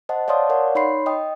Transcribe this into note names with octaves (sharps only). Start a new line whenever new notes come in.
C5 D#5 F#5 A5
C#5 D5 F5 A5 C6 D#6
A#4 C#5 D5 F5 F#5
D#4 C#5 B5 C6 C7
D#5 G5 D#6